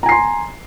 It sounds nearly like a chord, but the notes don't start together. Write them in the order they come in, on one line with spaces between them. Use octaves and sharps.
A#5 G#5 C7 C6